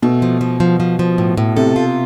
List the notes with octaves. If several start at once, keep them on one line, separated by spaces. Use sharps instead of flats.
B2 A3
F3
F3
F3
F3
F3
A2
A2
C3 A4
F4